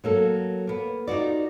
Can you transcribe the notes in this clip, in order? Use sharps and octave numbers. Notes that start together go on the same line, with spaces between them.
F#3 A#3 A4
A#3 B3
D#4 F4 F#4 D5